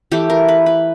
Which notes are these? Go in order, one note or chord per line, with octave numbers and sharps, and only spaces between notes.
E3 A3 G4
A#4
B4
B4